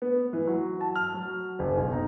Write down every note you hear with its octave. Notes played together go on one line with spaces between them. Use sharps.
B3
E3
F#3
A5
F6
F#3
F#1
B1
D#4